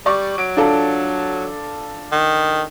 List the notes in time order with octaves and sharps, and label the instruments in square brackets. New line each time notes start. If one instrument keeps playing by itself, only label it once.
[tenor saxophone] G3 [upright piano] D5 C#6
[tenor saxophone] F#3 [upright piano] D7
[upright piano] D4 F4 A4
[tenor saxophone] D#3